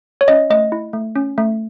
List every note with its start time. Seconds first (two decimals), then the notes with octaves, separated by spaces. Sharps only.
0.21 C#5
0.28 C#4 D#5
0.50 A3 D#5
0.72 E4
0.93 A3
1.16 C#4
1.38 A3